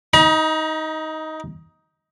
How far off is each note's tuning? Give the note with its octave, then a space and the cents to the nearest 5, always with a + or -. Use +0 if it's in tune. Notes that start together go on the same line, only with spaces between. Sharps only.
D#4 +15 A#5 +45